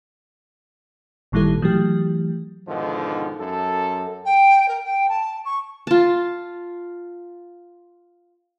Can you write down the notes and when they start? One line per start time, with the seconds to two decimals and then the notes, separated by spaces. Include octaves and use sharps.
1.32 G#1 A#2 D#3 G3 E4 A4
1.62 E3 F#3 A3 G4
2.67 G#2 B2 D3 D#3 F3
3.39 F#2 A4
4.25 G5
4.68 A#4
4.84 G5
5.08 A5
5.44 C#6
5.87 F4 A5